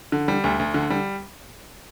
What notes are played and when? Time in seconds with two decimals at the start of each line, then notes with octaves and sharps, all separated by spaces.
0.12 D3
0.28 G3
0.44 D2
0.59 D2
0.74 D3
0.90 G3